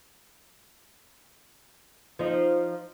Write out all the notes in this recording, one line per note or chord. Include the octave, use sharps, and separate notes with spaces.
F3 D#4